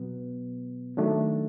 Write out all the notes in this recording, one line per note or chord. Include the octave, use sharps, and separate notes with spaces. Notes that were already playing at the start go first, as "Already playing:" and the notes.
Already playing: B2 F#3 B3
D#3 F#3 A3 D4